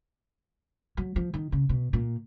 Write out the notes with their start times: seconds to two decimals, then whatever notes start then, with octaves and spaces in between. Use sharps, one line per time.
0.97 F#3
1.16 F3
1.34 D#3
1.52 C#3
1.69 B2
1.93 A#2